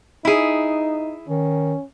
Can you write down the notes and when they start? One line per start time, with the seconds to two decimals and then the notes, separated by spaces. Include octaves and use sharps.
0.25 D#4 E4 G#4
1.28 D#3 C#4